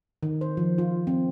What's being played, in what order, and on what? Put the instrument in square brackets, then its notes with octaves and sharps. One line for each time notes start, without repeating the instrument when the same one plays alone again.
[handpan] D#3
C5
F3
F4
C4